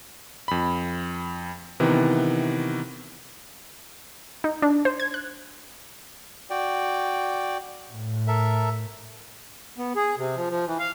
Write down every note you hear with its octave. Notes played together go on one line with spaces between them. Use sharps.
F2 B5
C3 D#3 E3 B3
D#4
D4
C5
G#6
F#6
F#4 D5 G5
A2
A4 A#4 E5
B3
G#4
C3
F3
F3
E3
F5